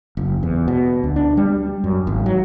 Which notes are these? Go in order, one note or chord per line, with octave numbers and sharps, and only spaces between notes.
F#1
E2
B2
D2
D4
G3
F#2
G#1
F#3